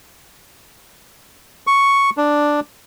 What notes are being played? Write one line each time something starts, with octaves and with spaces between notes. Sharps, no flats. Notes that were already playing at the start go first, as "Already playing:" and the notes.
C#6
D4